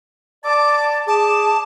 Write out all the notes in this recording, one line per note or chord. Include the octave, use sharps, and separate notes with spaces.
D5 A5 D6
G#4 A5 D6